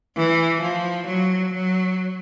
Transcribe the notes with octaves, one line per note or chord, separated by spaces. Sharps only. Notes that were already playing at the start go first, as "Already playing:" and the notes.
E3
F3
F#3
F#3